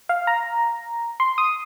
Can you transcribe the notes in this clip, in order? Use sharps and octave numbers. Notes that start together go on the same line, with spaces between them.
F5
A#5
C6
D#6